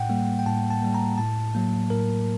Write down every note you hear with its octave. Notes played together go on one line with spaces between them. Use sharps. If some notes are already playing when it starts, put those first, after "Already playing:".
Already playing: A2 F#5 G5
G3 A#3
G5
A2 A5
A5
G3 A#3
A#5
A2 A5
F#3 A#3
A2 A#4